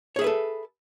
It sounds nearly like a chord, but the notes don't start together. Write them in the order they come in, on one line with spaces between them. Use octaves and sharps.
C#5 G#4 E5 B4 A4